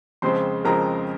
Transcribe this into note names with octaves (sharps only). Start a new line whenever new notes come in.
F2 C#3 F3 G#3 C4 C5 C6
F2 C#3 F3 G#3 C4 A#4 A#5